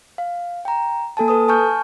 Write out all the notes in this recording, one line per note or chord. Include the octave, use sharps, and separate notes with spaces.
F5
G5 A#5
A#3 A4 G#5 A5
A4 B4 D#6
G#5 A5 C#6 F6 G6